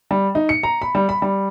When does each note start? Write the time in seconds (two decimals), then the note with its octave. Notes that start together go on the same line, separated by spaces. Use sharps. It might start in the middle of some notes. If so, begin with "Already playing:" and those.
0.11 G3
0.35 D#4
0.49 C#7
0.63 A#5
0.82 B5
0.95 G3
1.09 B5
1.22 G3